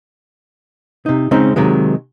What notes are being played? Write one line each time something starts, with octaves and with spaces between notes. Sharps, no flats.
C3 D#4
C#3 G#3 C4 C#4 D#4
C3 D#3 F#3 G#3